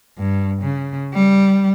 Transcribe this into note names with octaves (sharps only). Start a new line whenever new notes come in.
G2
C#3
G3